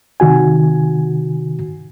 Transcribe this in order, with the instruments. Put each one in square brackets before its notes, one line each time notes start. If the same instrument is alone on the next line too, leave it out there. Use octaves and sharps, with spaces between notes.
[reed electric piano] C3 D#3 F#4 G#5